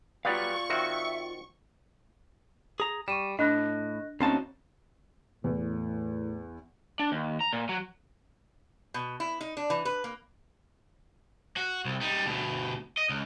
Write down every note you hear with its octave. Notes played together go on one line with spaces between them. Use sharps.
F#3 G3 B3 F4 D5 F5 C#6
D#3 C4 F#4 E5
G#4 A#5
G3 C#6 D#7 E7
A2 D4 D#5 F#6 A#6
D2 A#3 C4 C#4 D#4 F#4 C#5 A5
E2 A2
D4
D#2
A#5
A#2
F#3
B2
E4
D#4
D4
E3
B4
A#3
F#4
C2
G3 D#4
D2 B2
D#5
C#2